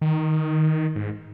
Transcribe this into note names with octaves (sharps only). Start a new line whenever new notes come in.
D#3
G#2